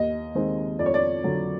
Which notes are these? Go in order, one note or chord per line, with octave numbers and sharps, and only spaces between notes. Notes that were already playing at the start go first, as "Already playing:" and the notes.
Already playing: D#2 D#5
D#3 G#3 C4
F2 D5
C#5
D5
D3 F#3